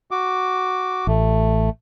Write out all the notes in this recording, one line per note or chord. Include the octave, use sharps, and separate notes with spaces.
F#4 D6
A1 A3